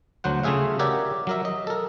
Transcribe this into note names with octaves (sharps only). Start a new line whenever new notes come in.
D2 F#3 C5 F#5
C#3 A3 F4 G#4 E5 F5
F#4 G4 A#4 C#5 D5 E5
F#3 A#4 E5
D#5
A4 A#4